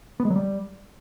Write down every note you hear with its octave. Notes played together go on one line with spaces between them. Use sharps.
B3
G#3
F#3
G3